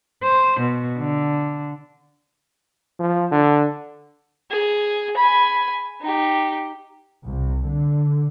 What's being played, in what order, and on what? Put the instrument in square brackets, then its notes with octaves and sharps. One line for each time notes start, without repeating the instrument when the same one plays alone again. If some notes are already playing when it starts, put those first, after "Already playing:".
[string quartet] C5
B2
D3
[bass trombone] F3
D3
[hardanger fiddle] G#4
G#5 B5
D#4 G4
[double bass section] C2
D3